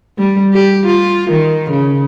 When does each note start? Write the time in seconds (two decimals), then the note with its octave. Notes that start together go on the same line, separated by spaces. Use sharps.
0.18 G3
0.54 G4
0.86 F4
1.31 D#3
1.71 C#3